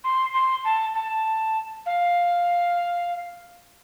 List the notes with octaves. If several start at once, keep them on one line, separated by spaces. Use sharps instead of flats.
C6
C6
A5
A5
F5